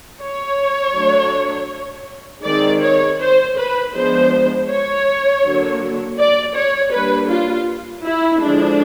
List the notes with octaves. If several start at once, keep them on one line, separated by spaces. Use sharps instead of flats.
C#5
F#3 A3 D4
D#3 G#3 C4 D5
C#5
C5
B4
F3 G#3 B3 D4 C5
C#5
D3 F#3 A#3 D4
D5
C#5
G3 A#3 D4 B4
F4
E4
D3 F3 G#3 D4